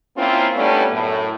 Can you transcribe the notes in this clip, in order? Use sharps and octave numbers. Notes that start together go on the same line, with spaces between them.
A#3 C4 C#4 E4 F4
G3 A3 B3 C#4 D4
F#2 A2